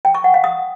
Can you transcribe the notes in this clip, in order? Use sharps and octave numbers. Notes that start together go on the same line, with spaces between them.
G5
C#6
F#5
F5
D#6